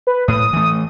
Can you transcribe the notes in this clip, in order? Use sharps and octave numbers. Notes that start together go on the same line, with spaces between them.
B4
A2 D#6
E3 A3